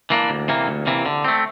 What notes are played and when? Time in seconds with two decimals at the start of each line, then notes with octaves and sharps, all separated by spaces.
0.10 E3 A#3 D4
0.30 D2
0.48 C3 E3 A#3
0.68 D2
0.87 C3 E3 A#3
1.06 D3
1.24 A3 C4